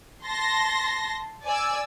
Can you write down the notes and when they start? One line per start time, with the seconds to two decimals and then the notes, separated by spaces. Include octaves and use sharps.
0.25 A5 C6 A#6
1.45 D5 G#5 E6